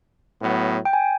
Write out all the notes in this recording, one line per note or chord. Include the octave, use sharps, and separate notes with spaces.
A2 F#3 B3
G5
G#5